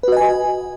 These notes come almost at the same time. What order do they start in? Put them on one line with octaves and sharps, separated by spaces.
B4 F#4 D#5 G#5